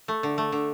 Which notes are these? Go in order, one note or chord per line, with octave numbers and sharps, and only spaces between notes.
A3
D3
A3
D3